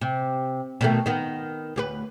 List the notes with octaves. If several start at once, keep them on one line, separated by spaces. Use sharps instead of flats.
C3
B2 D#3 A3
D#3 B3
D2 G4 B4